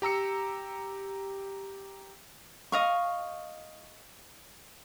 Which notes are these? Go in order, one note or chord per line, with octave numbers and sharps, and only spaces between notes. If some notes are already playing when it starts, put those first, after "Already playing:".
G4 A#5 E6 C#7
D#5 F5 C#6